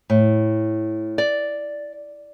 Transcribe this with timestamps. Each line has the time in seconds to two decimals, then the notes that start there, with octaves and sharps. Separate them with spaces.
0.10 A2
1.18 D5